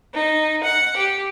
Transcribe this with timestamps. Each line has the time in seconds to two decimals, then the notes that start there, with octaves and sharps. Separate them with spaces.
0.13 D#4
0.63 F#5
0.97 G4